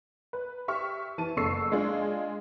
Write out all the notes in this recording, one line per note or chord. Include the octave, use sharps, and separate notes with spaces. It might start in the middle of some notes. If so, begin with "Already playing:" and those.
B4
G4 E5 C#6 F6
E3 A5 D#7
F#1 C#3 A4 C#6 E6 C7
G#3 D4 F4 G#4